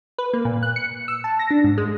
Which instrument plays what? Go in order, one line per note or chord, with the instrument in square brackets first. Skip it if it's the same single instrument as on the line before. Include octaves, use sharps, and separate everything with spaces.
[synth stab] B4
A#3
A#2
F#6
C#7
E6
A5
A#6
D4
G#2
G#3